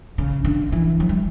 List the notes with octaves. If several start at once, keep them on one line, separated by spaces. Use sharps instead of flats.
C#3
D3
E3
F#3
G3